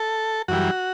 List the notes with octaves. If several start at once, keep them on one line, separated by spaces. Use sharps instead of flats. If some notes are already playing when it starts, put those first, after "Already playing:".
Already playing: A4
F#2 E3 G3 F#4